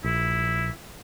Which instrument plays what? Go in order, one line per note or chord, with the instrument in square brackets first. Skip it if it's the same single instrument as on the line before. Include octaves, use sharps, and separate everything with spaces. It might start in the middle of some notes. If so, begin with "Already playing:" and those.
[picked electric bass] A#1 [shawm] E4